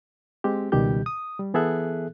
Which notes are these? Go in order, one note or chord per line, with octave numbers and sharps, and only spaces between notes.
G#3 C4 G4
C#2 B2 D#3 G3 G4 G6
D#6
G3
E3 B3 G#4 A4 E5 F#6